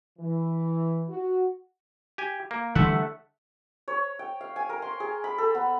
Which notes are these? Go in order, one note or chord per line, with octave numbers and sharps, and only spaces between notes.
E3
F#4
G4 G#5
A#3
D3 E3 G3 A3 E5 F#5
C#5
G5
F5
G#5
A#4
C6
G#4
B5
A4
B3